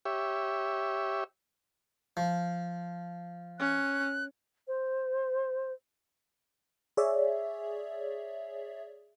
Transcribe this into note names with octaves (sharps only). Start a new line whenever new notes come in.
G4 C#5 E5
F3
C#4 F#6
C5
G#4 C#5 D5 E5